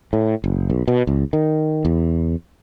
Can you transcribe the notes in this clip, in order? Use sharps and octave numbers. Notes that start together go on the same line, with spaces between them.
A2
F#1
B1
B2
C#2
D#3
E2